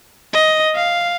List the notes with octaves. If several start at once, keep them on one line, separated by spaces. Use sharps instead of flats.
D#5
F5